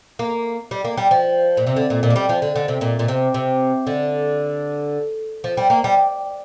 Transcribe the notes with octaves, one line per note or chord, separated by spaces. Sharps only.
A#3
G3
A#3
G3
F3
A#2
C3
D3
A#2
A#2
A#3
G3
F3
D3
D3
C3
A#2
A#2
C3
C3
D3
F3
G3
A#3
G3